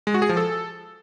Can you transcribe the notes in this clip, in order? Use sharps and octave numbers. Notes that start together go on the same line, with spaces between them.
G#3
F#4
G#4
F3
A4